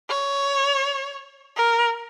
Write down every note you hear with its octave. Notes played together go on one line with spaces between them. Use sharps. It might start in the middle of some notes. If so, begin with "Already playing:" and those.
C#5
A#4